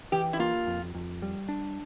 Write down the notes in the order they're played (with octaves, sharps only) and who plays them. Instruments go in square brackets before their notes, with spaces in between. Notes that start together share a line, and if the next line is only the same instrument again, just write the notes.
[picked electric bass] E3 [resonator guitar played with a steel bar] G4
[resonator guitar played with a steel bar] E4
[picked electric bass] A#3 [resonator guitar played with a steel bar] F4
[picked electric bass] F2
F2
G3
D4